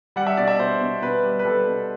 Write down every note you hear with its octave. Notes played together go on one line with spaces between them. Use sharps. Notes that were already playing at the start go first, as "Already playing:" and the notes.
G3 F#5
E5
B2 D5
E5
B2 C5
B2
B2 B4
G3
B4
G3 A4
B2